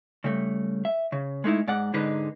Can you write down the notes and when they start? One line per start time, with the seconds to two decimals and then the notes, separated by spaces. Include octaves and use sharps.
0.24 C#3 G3 A3
0.85 E5
1.12 C#3
1.44 G#3 A3 D#4 E4
1.68 G#2 D5 F#5
1.93 G#2 D3 G#3 D#4 B4